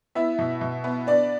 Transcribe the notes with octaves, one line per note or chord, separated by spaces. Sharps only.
B3 E4 E5
B2
B2
B3
B3 D4 D5